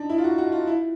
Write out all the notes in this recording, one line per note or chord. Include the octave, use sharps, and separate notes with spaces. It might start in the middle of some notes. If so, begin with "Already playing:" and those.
Already playing: D4 D#4
E4
F4
F#4
F#4
F4
E4